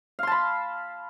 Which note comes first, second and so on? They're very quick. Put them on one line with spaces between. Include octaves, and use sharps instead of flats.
F5 C6 A5 B5